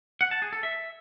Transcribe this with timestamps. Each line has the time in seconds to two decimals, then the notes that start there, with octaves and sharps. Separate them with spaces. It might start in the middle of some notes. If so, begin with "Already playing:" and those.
0.21 F#5
0.31 A5
0.42 G#4
0.53 A4
0.63 E5